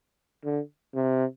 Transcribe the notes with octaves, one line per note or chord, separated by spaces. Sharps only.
D3
C3